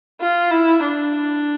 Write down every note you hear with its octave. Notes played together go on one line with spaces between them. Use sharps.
F4
E4
D4